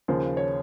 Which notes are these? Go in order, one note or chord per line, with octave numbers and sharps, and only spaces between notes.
D#2 C#3 F3 C5
C#5